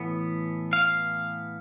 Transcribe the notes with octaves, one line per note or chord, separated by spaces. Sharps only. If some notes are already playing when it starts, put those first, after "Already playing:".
Already playing: A2 E3 B3
F5